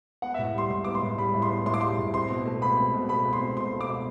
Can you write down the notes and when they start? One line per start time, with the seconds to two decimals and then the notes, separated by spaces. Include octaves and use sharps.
0.22 B3 F#5
0.34 E5
0.39 A2
0.54 G3 C6
0.70 A2 C6
0.85 B3 D6
0.95 C6
1.02 A2
1.18 G3 B5
1.34 A2
1.42 C6
1.50 B3
1.66 A2 C6
1.74 D6
1.81 G3 C6
1.98 A2
2.13 C4 C6
2.30 B2
2.46 A3
2.61 B2 B5
2.77 C4
2.93 B2
3.09 A3 B5
3.25 B2
3.33 C6
3.41 C4
3.57 B2 C6
3.73 A3
3.81 D6
3.88 B2